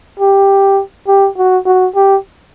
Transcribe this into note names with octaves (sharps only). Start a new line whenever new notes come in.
G4
G4
F#4
F#4
G4